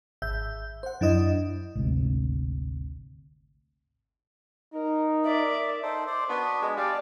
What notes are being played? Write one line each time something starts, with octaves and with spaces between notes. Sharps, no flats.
G#1 E5 G6
C5 F#5
F#2 D4 E4 D#5
G#1 D2 C3
D#4 A#4
A#4 D5 E5
D#4 A4 C5
C5 D5
B3 D4 F#4
G#3
G3 D5 F5 A5